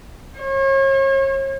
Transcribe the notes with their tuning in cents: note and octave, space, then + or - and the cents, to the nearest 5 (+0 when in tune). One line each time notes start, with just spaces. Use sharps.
C#5 -40